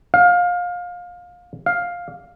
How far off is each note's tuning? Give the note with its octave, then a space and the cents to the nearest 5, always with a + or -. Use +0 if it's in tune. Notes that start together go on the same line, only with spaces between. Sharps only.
F5 +25
F5 +10